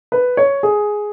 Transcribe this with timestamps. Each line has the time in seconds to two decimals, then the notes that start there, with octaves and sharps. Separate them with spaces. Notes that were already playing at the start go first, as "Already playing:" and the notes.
0.12 B4
0.37 C#5
0.63 G#4